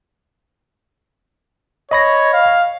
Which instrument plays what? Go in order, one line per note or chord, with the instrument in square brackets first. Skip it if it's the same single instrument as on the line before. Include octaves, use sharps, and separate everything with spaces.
[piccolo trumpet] C#5 [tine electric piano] D#5 B5 A#6
[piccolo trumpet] F5